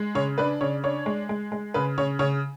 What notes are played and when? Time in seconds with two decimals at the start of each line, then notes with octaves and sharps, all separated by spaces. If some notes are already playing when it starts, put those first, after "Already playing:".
Already playing: G#3
0.15 C#3 C#5
0.38 D4 B4
0.61 C#3 C#5
0.84 D4 C#5
1.06 G#3
1.29 G#3
1.52 G#3
1.74 C#3 B4
1.98 C#3 C#5
2.19 C#3 C#5